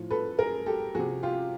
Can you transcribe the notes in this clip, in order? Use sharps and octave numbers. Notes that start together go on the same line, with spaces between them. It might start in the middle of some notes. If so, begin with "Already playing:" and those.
Already playing: A2 F3
A4 B4
G#4 A#4
G4 A4
C3 F3 F#4 G#4
F4 G4